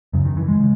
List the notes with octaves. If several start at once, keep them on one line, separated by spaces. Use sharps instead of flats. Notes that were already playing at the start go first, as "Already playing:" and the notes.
F#2 C#3
D#3
E3
G#3
C#3